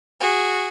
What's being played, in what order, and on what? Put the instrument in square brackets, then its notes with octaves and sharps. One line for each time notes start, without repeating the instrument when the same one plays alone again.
[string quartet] F#4 G#4